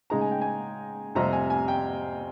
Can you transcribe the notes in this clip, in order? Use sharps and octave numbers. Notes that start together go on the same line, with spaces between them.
C#3 G#3 D#4 A#5
G#5
G5
G#5
F2 C3 G3 C4 A#5
G#5
G#5
G5